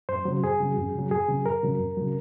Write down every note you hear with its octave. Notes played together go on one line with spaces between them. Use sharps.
F#2 C5
C#3 F#3
F#2 G#4
C#3 F#3
F#2
C#3 F#3
F#2 G#4
C#3 F#3
F#2 A#4
C#3 F#3
F#2
C#3 F#3